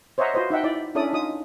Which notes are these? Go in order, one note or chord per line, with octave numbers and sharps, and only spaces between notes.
C5 C#5 D#5 E5 F#5 A#5
F4 F#4 B4 C5 D#5
D#4 E5 F#5 G5
E4 D5
C#4 D4 E4 A4 D5 D#6
D#4 F4 D#6